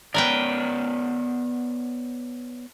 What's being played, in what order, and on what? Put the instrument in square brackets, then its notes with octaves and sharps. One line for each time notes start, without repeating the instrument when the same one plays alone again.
[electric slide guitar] B3 C#5 D5 [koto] A#4 B4 G5